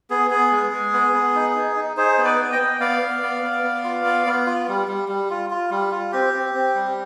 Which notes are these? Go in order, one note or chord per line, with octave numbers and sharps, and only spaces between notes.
B3 G#4
B3 G#4
G#3
G#3
B3
B3
D#4
D#4
D#4
D#4 G#4 C5
B3
B4 D5
B3
D#5 G5
B3
B3 D5 F5
B3
B3
B3
B3
F4
B3
B3
F4
G3
G3
G3
F4
F4
G3
F4
C4 G4
C4
C4
G3